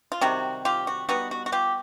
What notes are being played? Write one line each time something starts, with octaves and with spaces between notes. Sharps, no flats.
F4
C3 D#3 G3 F#4
F4 G4
F#4
G3 B3 D#4 F#4
F#4
F#4
F4 G4